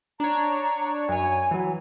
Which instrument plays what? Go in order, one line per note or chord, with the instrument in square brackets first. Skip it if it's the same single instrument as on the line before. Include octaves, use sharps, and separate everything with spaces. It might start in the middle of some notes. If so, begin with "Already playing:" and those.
[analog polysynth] D4 C#5 [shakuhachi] A#5
[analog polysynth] F#2 C#5 [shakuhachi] G#5
[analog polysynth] E3 F#3